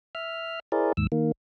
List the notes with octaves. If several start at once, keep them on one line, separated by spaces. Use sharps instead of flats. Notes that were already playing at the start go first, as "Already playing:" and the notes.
E5 F6
E4 G#4 A#4 C5 D5
D#2 G#2 E6
D#3 A#3